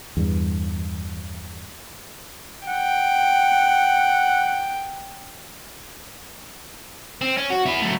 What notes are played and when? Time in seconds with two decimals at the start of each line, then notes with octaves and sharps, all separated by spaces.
0.17 E2 G2
2.67 F#5 G5
7.22 C4
7.37 C#4
7.50 F#4
7.66 B3 E4
7.81 F#3 A3